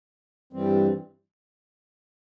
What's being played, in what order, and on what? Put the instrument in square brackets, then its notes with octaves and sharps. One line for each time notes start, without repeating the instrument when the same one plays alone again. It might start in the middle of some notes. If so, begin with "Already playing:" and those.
[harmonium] G2 E3 G3 C4